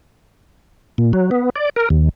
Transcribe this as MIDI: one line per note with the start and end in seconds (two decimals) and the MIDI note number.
0.98 1.12 46
1.13 1.30 54
1.31 1.50 59
1.56 1.69 74
1.76 1.89 70
1.90 2.09 39